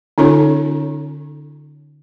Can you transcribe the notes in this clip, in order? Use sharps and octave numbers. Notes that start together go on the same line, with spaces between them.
D3 C#4 D#4 F4 A4 C#5